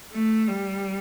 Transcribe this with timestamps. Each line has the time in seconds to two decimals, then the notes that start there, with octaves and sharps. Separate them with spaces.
0.13 A3
0.48 G3